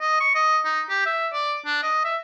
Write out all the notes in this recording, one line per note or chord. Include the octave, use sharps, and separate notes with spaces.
D#5
C#6
D#5
D#4
G4
E5
D5
D4
D#5
E5